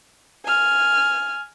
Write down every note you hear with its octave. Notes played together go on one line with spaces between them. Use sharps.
G#5 F6